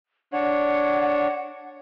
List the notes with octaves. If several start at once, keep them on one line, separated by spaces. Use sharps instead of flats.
D4 C#5 F#5